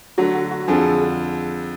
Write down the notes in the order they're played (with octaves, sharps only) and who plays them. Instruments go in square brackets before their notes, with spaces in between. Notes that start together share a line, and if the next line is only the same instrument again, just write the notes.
[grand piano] D3 F#3 A3 [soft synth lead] F#4
[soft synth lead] F#4
F#4
[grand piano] F2 D3 F3 [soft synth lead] G#4